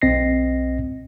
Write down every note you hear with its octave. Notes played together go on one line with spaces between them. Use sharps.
B1 C4 D#5 A#6 C7